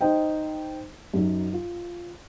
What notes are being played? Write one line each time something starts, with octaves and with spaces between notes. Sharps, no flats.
D#4 C5 D#5 G5
F#2 F#3 D#4
F4